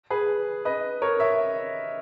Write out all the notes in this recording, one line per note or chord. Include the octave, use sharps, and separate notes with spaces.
G#4 B4
B4 D#5
A#4 C#5
C#5 E5